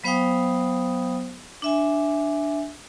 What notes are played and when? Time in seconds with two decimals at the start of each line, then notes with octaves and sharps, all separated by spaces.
0.04 F#3 B3 C5 F5 G5 D#6
1.62 D4 E5 G#5